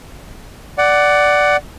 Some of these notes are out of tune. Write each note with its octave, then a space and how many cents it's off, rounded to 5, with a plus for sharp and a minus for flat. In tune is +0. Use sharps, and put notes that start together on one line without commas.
D5 +0 F#5 +15